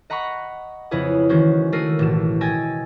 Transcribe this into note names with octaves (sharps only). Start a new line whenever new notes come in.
D#5 F#5 A#5 B5 C#6
F2 C#3 E4 G#4 B4 D#6
D#3 E3 G#3 C#4 F#4 C5
A3 F#4 A#4 E6 C7 D#7
A1 B2 E7
D#5 G5 G#5 E6 G#6 A6